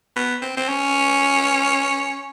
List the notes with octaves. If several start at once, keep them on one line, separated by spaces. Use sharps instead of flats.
B3
C4
C4
C#4